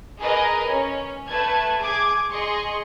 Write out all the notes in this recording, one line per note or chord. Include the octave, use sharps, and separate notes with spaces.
G#4 A#4 B4 D#5 G#5
C#4
A3 B4 A5 G#6
G#4 D6 G#6
G#4 D#5 C6 C#6